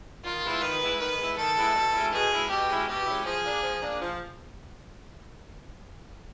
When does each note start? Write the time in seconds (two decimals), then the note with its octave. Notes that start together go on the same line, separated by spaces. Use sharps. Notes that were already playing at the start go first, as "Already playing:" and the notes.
0.25 D#3 F4
0.44 G#3 B3 E4
0.61 D#3 B4
0.81 G#3 B3 E4
1.00 D#3 B4
1.18 G#3 B3 E4
1.37 D#3 A4
1.56 G#3 B3 E4
1.75 B2
1.93 G#3 C#4 E4
2.12 B2 G#4
2.31 G#3 C#4 E4
2.50 B2 G4
2.69 G#3 C#4 E4
2.88 B2 G4
3.06 G#3 C#4 E4
3.25 F3 G#4
3.44 A#3 D4
3.63 F3
3.82 A#3 D4
4.01 F3